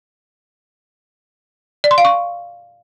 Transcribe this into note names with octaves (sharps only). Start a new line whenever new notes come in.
D5
C6
F5
C#6